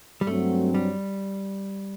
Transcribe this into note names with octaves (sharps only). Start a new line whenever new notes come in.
G3
G2 F#3 A3 C4
G3